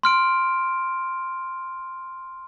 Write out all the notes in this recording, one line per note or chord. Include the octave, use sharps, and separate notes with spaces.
C6 F6 D7